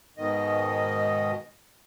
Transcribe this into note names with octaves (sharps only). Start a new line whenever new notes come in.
G#2 B2 D#3 D#5